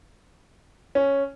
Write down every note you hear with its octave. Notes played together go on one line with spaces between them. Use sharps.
C#4